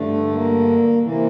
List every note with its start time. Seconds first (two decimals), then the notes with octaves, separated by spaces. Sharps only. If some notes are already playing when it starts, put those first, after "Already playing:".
Already playing: G2 D3 A3
0.32 A#3
1.02 C3 E3 A#3